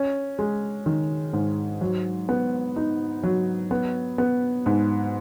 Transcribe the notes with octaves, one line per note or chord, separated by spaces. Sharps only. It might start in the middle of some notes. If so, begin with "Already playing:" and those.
Already playing: C#4
G#3
D#3
G#2
F#3
B3
D#4
F#3
B3
B3
G#2